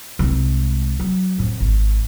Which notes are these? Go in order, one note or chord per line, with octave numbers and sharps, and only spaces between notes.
C2 G#3
F#3
F2 A2
G#1